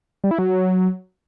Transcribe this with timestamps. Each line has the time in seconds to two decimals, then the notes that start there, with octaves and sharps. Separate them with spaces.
0.24 G3
0.31 E4
0.39 F#3